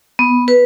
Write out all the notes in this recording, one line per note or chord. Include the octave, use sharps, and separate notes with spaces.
B3
B4